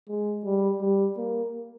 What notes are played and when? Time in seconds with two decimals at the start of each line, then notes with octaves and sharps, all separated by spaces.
0.09 G#3
0.45 G3
0.81 G3
1.17 A#3